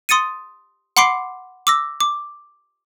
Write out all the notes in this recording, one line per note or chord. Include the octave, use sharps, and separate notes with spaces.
C6 D#6 A6 C#7 D#7
F#5 B5 C6 D6 C7 D7
D6 E6 A#6
D6